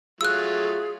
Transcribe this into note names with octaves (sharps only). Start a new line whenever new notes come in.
F#3 A3 F4 G#4 E6 F#6